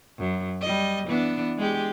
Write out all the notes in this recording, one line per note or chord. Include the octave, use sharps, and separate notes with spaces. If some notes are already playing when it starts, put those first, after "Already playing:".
F#2
G3 D#5
E3 B3 D4
G#3 G4